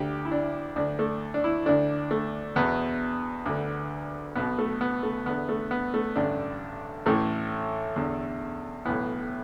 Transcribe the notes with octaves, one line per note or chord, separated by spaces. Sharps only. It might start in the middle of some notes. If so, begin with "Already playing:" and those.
Already playing: D2 D3 G4
E4
D4
D2 D3 D4
A3
D4
E4
D2 D3 D4
A3
E2 B2 B3
D2 D3
B1 B2 B3
A3
B3
A3
E2 D3 B3
A3
B3
A3
A1 G2 D3 D4
A1 A2 E3 A3
E2 D3
B1 A2 E3 B3